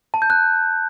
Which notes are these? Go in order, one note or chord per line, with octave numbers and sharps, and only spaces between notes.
A5
G6
F#6